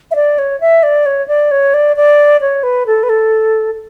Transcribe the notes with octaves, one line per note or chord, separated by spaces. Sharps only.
E5
D5
C#5
E5
D5
C#5
D5
C#5
D5
D5
C#5
B4
A4
B4
A4